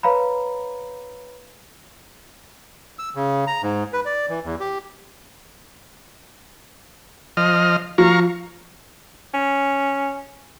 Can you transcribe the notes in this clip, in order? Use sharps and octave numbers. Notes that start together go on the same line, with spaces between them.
B4 C#5 F5 A#5 B5
E6
C#3
A#5
G#2
B4
D5
E3
E2
G4
F3 D#5 F6
F3 F5 A#5 C#6
C#4